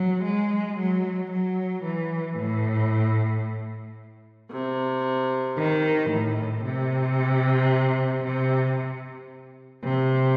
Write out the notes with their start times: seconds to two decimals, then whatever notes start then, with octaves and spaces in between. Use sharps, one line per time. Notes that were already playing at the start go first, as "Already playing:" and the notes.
Already playing: F#3
0.25 G#3
0.78 F#3
1.32 F#3
1.84 E3
2.37 A2
4.51 C3
5.57 D#3
6.11 A2
6.64 C3
8.24 C3
9.83 C3